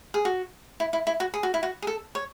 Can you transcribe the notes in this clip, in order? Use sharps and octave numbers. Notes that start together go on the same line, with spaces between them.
G#4
F#4
E4
E4
E4
F#4
G#4
F#4
E4
F#4
G#4
A4
C#5